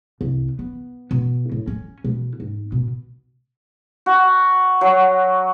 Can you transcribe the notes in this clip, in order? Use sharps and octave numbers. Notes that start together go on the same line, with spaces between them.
C2
B3
B2
A2
C#4
B2
G#2
B2
F#4
F#3